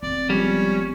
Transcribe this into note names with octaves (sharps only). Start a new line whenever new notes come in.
F1 C4 D5
F3 G3 G#3 B3 C#4